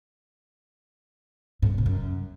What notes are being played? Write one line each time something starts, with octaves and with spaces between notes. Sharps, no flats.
A2
B2
C3
F#2